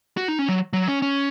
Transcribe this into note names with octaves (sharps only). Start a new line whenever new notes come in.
F#4
D#4
C#4
F#3
F#3
C#4
C#4